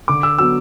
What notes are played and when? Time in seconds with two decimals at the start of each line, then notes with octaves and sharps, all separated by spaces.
0.08 D3 D6
0.23 E6
0.39 F#3 B3 E6